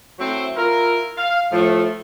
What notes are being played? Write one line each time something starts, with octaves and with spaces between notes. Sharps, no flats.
F#3 A3 C4 E4 C5
E4 F4 A#4
F5
A2 F3 A3